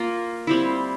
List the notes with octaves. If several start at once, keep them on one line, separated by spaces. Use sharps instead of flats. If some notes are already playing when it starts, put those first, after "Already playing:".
Already playing: A#3 F4 A#4
G3 C4 E4